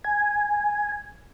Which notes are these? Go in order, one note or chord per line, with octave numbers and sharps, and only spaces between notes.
G#5